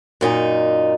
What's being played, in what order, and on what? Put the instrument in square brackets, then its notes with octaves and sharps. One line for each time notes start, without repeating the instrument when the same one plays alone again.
[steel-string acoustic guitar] F#2 A#2 D#4